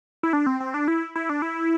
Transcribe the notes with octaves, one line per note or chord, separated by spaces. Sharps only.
E4
D4
C4
C4
D4
E4
E4
D4
E4